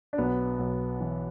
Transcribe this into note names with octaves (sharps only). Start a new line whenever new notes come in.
D4
B1 B3
B1
E3